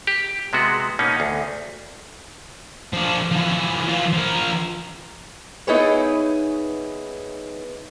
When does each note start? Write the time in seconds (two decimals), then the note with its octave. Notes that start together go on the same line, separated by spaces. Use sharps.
0.07 G4
0.53 C3 G#3 B3 F#4
0.99 B2 A#3 C#4 D#4
1.20 D2
2.93 F3 D4
3.32 E3 F3
3.87 E3 F4
4.13 F3 A#4
5.67 B3 D#4 E4 G#4 B4 C#5